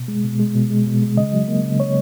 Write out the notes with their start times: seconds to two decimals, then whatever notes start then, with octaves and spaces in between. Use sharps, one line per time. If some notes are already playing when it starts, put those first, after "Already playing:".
Already playing: B2
0.08 G#3
0.24 B2
0.40 G#3
0.55 B2
0.70 G#3
0.87 B2
1.02 G#3
1.17 C#3 D#5
1.33 F#3
1.48 A#3
1.64 C#3
1.80 C#3 C#5